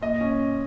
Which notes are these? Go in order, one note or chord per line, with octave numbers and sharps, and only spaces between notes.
A#2 D#5
C#4